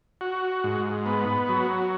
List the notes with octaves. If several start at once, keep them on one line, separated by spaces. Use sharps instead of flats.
F#4
G#2
B3
F#3